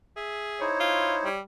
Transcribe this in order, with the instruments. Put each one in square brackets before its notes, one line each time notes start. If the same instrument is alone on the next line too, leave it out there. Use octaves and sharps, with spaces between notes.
[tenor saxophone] G#4 [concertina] E5
[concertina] D#4 E4 C5 [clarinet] C#5
[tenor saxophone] F4
G3